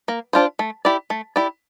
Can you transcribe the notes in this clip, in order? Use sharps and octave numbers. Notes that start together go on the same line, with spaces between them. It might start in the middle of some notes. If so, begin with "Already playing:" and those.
A#3
D4 F4 C5
A3
E4 G4 D5
A3
E4 G4 D5